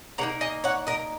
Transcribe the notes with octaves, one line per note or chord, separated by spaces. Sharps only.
C#3 A#3 D#4 F#5 A#5
D#5 G#5
C#5 F#5
A#4 D#5